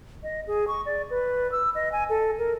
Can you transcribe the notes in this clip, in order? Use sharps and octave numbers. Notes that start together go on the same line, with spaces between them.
D#5
G#4
C#6
D5
B4
E6
D#5
G#5
A4
A#4